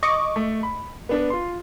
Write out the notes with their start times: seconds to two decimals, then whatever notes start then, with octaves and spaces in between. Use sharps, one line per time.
0.03 D#5 C#6 D6
0.36 A3
0.63 B5
1.09 B3 D4 B4
1.30 F4 C6